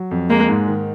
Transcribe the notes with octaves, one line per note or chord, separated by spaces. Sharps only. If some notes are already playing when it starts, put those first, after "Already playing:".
Already playing: F#3
F2
G#3 A#3
G#2
D#3